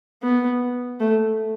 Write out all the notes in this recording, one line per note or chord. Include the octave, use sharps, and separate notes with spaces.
B3
A3